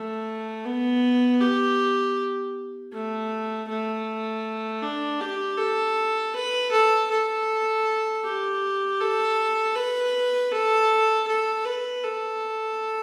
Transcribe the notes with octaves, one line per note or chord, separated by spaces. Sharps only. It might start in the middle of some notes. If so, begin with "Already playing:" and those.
Already playing: A3
B3
G4
A3
A3
D4
G4
A4
B4
A4
A4
G4
A4
B4
A4
A4
B4
A4